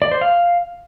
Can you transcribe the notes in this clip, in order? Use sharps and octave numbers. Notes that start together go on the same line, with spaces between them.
D5
C5
F5